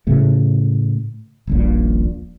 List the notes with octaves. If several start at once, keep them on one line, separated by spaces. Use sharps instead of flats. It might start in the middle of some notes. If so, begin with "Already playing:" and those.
A2 C#3 A3
D#1 A#1 A#2